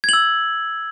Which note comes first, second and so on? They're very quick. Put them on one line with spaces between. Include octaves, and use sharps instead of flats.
G#6 F#7 E6